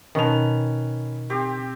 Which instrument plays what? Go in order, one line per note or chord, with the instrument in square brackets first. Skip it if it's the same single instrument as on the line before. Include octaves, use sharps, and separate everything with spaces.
[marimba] B2 A5 [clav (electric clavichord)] D#3 [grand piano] C#4 B4 F7
[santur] C4 G4